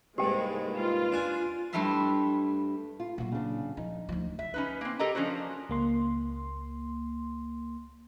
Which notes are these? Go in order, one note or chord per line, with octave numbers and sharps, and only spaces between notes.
C2 G#2 G#3 A#3 D#4 G4 B4 G5
F4
D4 G#5
G2 G3 A3 E4 E5 C6
F4
A#2 F#3 F#4
C#3 D4
F3 D#4
D2 F3
E5
C#4 D#4 B4
A#3 C4
G4 A4 A#4 D#5 A#5
F3 C#4 D4 F#4 C5
C#2 A#3 C6